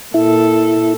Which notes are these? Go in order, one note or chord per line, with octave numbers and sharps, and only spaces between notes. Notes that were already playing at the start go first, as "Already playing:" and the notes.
A#2 E4 A4